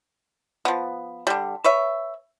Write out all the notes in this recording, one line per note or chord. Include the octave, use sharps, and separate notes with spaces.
F3 B3
D3 G3
B4 C#5 E5